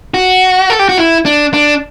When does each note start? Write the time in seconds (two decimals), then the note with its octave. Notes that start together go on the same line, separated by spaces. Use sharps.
0.14 F#4
0.70 A4
0.79 G4
0.89 F#4
0.98 E4
1.25 D4
1.54 D4